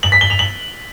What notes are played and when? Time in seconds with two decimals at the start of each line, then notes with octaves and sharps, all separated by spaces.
0.03 F#7
0.12 B6
0.21 G7
0.30 F7
0.39 F#7